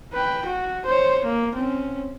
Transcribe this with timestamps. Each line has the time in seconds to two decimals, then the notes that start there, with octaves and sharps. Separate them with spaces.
0.13 B4 G5
0.46 F#4
0.86 C5 C#5
1.25 A#3
1.55 C4 C#4